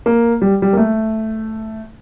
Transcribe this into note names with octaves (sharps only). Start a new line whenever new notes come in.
A#3
G3
G3
A#3
A3